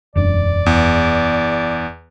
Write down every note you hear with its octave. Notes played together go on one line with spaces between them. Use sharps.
E1 F#2 D4 D5
E2